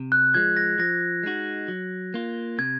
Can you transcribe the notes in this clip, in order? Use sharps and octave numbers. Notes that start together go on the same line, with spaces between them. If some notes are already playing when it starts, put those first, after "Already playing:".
Already playing: C3
F#6
F3 G#3 G#6
A#6
F3 A#6
G#3 D#4 F#4
F#3
A#3 F4
C3 G#6